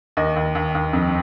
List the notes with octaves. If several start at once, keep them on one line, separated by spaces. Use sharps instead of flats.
D#2 D#5
D#2
D#2
D#2
F2